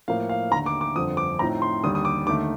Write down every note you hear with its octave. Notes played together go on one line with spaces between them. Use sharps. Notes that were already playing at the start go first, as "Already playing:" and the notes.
A2 F3 A#3 F5
F5
D#2 D3 A3 A#5
D6
D6
G1 F2 D3 F3 D#6
D6
A2 F3 C4 D#4 A#5
C6
D#2 D3 G3 D#6
D#6
D6
D#2 D3 A3 D#4 D6